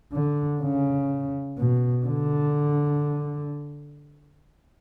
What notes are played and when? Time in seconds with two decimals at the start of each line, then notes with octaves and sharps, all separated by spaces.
0.13 D3
0.61 C#3
1.57 B2
2.07 D3